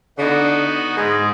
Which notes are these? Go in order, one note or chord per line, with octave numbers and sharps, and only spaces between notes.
D3 B3 D#4 F#4
G#2 G#3 G#4